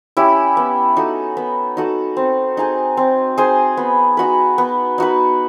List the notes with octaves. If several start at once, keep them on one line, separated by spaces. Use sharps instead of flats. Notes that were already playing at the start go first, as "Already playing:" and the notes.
C#4 E4 G4
B3
D#4 F#4 A4
B3
D#4 F#4 A4
C4
D#4 G#4 C5
C4
D#4 G#4 C5
B3
D#4 F#4 B4
B3
D#4 F#4 B4